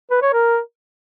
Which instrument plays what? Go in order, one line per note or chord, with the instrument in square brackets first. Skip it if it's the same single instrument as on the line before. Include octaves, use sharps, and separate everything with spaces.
[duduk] B4
C#5
A#4